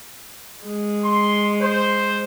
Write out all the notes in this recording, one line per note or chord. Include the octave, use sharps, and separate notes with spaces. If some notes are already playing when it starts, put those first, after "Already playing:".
G#3
C6
C5